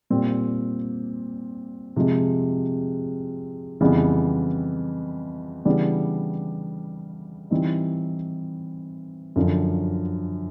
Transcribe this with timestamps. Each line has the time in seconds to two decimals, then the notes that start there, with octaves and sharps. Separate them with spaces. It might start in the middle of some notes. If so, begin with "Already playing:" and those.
0.10 A#2 G3 C4
1.96 C3 F3 G#3
3.81 F2 C#3 E3 G3 B3
5.65 C#3 E3 G3 B3 D4
7.51 E3 G3 C4 D#4
9.36 F#2 D3 F3